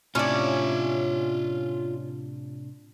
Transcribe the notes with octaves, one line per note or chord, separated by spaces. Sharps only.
A2 C3 C#4 D4 F4 D5 E5